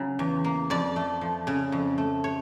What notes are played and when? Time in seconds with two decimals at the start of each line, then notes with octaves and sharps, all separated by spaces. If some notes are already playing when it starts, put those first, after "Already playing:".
Already playing: C#3 F#3
0.19 E2
0.44 A#3
0.70 F2 D5
0.96 A3
1.21 F3
1.47 C#3
1.72 F2
1.98 A3
2.24 C#5